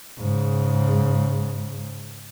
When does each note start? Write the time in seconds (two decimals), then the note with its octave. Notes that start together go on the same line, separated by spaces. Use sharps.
0.19 G#2 C#3